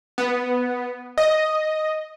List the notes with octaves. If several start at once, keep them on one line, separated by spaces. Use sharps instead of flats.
B3
D#5